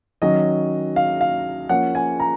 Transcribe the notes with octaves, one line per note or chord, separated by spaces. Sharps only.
D#3 F#3 C#4 D#5
F5
F5
F3 A#3 C#4 F#5
G#5
A#5